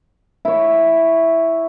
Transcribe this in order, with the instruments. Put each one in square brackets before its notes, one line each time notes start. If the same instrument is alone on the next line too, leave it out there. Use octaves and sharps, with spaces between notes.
[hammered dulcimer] E4 C#5